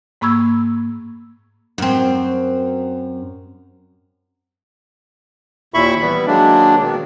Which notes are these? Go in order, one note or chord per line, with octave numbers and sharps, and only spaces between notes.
G#2 A#3 B5 C#6 E6 G#6
F#2 C4
D#2 A#2 E4 E5 B5 C#6
E3 G3 B3 E4
D#3 F#3 G#3 A#3 D4
B2 D#3